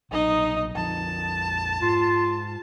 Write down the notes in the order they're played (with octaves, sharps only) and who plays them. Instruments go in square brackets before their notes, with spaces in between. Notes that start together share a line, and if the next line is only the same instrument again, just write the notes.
[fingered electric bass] A#1 A#2 F#3 [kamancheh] D#4 D#5
[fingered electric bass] A#1 F2 F3 [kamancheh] A5
[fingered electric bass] G#2 [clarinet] F4